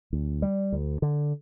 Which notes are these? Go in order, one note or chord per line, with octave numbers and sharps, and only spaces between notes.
D2
G3
D2
D3